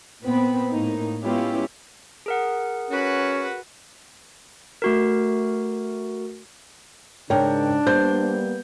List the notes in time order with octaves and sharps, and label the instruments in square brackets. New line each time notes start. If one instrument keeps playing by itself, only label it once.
[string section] A#2 B3 C4 B5
A2 A#3 D#4
G#3 B3 C#4 E4 F4 G4
[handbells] G#4 A#4 F#5
[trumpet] C#4 [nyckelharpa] F#4 B4
[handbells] A3 F#4 A#4
[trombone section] G#2 C#3 [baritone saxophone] D4 [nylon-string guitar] A#4 [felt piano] C#5 G5
[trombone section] G3 A#3 B3 [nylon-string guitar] C5 [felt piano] G6